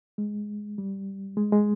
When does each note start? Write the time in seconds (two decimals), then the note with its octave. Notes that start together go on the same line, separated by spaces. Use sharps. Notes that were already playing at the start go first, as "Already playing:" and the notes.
0.18 G#3
0.78 G3
1.37 G#3
1.52 G#3